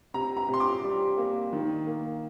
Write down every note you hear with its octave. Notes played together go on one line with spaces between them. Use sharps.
C3 A#5
A#5
C3
C6
D6
G3
A#3
D#3
A#3